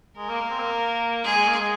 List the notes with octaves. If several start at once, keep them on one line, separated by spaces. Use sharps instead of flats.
G#3 A#4
A#3
A#3
C4
A#3
G#3 G#4
G#3
A#3
G#3